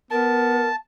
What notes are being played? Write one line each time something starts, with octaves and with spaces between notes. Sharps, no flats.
B3 A#4 A5